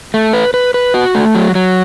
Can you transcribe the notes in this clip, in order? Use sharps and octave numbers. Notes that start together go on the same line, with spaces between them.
A3
B4
B4
B4
F#4
A3
F#3
F#3